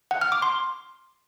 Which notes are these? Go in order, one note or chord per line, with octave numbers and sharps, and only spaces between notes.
F#5
F6
D6
C6